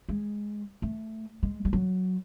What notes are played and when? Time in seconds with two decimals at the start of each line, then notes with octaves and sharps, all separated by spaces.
0.09 G#3
0.82 A3
1.43 G#3
1.65 G3
1.73 F#3